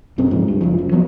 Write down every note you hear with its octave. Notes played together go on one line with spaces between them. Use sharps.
B1 F#2 C4
C#2 G#2 F3
G2
F#1 C#2 F3
F#2
F3 F#3 A#3 B3